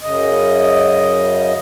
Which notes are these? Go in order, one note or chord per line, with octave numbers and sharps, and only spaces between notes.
F#2 C#3 D#5